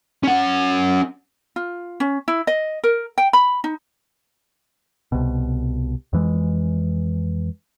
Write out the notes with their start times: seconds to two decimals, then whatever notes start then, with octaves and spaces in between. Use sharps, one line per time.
0.23 C#4 F#5
1.56 F4
2.00 C#4
2.28 E4
2.47 D#5
2.84 A#4
3.18 G5
3.33 B5
3.64 D#4
5.12 C2 B2
6.13 F2 E3 G#3